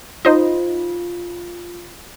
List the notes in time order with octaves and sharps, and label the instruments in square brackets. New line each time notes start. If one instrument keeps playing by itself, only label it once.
[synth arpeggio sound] D#4 C5 D#5 [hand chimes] F4